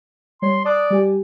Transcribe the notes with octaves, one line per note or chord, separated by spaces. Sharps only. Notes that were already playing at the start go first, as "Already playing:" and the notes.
G3 C#5 C6
D5 A5 D#6 F#6
G3 G4 G#5